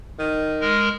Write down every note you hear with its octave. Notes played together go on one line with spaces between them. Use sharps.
D#3
G#3 A#4